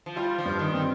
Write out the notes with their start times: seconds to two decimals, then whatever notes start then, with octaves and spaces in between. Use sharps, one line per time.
0.06 F3
0.16 G3 F4
0.38 F3
0.45 G2
0.59 D#3
0.74 D#3 C4